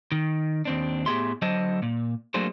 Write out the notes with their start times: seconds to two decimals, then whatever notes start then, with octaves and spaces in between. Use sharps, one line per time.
0.12 D#3
0.65 D#2 C4 D4
1.06 A2 B3 G4 G#4 E5 C6
1.42 D3 F#3 C5 D#5 A5
1.82 A#2
2.34 F#3 A3 A#3 D4 G#4 C5